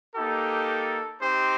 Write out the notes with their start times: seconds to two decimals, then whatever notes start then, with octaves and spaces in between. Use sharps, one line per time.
0.15 A#3 D#4 G4 A4
1.20 C4 D#4 G4 C5